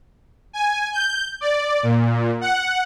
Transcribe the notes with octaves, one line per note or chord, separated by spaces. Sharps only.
G#5
G6
D5
A#2
F#5